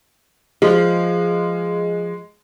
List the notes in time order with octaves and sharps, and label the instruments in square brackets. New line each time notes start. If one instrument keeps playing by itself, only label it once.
[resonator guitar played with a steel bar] F3 [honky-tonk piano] G#3